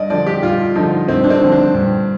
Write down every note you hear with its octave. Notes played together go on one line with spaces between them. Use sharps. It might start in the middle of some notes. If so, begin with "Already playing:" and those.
Already playing: G2 D5 D#5
D3 F3 D5
G4
G2 F4
D3 F3 D#4
G2 C4
D4
C4
D3 F3
D4
G2